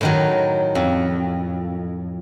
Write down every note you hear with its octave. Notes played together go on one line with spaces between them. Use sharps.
A2 D#3 F#3
F2